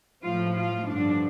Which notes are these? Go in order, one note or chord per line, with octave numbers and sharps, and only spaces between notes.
A2 F3 F4
F4
G2 D3 F3 D4